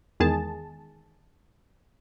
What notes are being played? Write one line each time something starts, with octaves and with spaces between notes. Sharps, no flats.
E2 D#3 G#3 G#4 A5